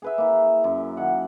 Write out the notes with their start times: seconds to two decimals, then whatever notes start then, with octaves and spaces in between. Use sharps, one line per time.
0.02 G#4 B4 E5
0.18 A#3 E4
0.64 F#2
0.97 D#3 F#5